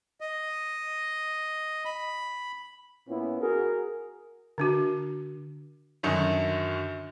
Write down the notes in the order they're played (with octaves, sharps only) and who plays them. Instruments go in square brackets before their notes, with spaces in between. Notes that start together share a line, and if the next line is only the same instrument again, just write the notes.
[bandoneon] D#5
B5
[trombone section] A#2 B3 C#4 E4
F#4 G#4 A#4
[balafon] D3 D4 F#4
[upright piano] F#2 D3 D#3 F#3